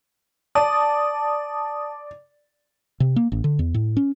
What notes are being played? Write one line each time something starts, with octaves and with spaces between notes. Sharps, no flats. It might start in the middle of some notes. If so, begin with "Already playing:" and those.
D5 A5 D#6
C3
A#3
A1
D3
E2
A2
C#4